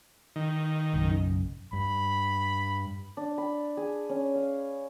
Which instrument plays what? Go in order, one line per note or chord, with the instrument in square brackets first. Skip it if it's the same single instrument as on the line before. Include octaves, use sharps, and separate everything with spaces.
[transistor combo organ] D#3
[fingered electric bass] F#1 B1 F#2
[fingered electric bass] G2 [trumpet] B5
[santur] D4
B5
G#4
C#4
F5